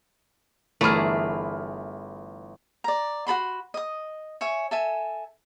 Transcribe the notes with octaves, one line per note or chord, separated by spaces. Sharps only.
G1 E3 A3 G#4 A#4 D5 B5 F6
D5 A#5
F#4 A4 B5 C6
D#5 D#6
C#5 E5 G#5
A4 E5 G#5